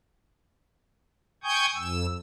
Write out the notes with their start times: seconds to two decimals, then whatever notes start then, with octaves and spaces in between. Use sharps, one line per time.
1.44 G5 G#5 C#6 D#6 G6 G#6
1.75 F2 E6